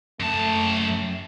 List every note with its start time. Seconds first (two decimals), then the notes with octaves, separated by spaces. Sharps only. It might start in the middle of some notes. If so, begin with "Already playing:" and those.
0.20 F#2 A3 A5